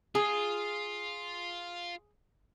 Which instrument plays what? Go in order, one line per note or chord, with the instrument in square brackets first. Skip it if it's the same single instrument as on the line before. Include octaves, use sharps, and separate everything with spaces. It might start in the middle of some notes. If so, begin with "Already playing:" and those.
[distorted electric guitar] F4 [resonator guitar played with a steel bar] G#4